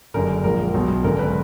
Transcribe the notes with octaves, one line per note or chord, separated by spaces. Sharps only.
F#1 F#2 D3 A#4
A#1 G#2 F3 A#4
B1 B2 F#3
G#1 F#2 D3 G#3 A#4
B4